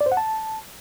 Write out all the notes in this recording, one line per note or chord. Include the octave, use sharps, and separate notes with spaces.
D5
C5
F#5
A5